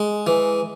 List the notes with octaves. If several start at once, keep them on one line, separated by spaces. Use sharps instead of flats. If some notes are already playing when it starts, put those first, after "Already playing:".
Already playing: G#3
E3